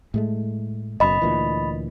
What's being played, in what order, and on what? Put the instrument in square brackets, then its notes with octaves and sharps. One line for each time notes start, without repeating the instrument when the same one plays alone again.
[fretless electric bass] A2 G#3 A3
[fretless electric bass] F#1 F#2 B2 [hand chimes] D#5 B5
[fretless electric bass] D2 A#2 E3